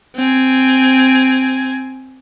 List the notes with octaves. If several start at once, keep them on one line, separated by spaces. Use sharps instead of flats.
C4 G#5